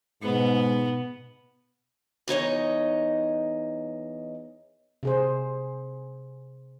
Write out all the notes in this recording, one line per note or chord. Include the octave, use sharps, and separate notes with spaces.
G#2 B2 B3
E2 D#4 C#5 D#5
C3 G#4 C5